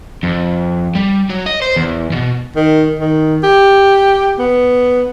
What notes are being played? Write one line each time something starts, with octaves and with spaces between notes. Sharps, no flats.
F2
G3
F#3
D#5
C5
E2
B2
D#3
D#3
G4
B3